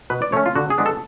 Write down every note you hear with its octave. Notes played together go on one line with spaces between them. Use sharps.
B2 B4
D5
A3 C#4 C#5
F4
D3 F#4
G#4
G#3 B3 D4
A4